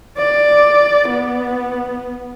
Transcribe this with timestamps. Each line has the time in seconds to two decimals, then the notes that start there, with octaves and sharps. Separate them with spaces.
0.18 D5
1.09 B3